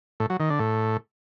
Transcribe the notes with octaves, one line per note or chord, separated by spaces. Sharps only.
A2
F#3
D#3
D3
A2